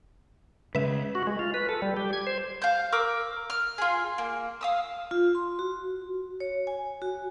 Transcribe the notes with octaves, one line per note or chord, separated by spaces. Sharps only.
C#3 G#3 C#4 B4 E5
F#4
G#3
F4
B4
A4
G3
G4
G#6
C5
F5 G6
A#4 D6 E6
F6
F4 G#4
A#3
F5 D#6 E6
F4
C6
F#4
C#5
G#5
F#4